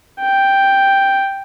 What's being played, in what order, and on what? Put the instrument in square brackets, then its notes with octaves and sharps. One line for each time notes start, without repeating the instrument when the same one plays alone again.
[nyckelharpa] G5